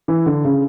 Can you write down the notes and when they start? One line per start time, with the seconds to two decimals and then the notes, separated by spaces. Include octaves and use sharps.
0.08 E3
0.26 D3
0.45 C#3